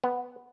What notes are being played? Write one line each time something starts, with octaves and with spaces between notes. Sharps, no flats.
B3